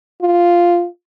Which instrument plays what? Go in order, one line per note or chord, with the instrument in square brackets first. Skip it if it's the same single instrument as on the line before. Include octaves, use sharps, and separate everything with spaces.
[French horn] F4